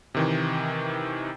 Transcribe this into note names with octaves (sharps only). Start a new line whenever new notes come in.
C3 D#3 E3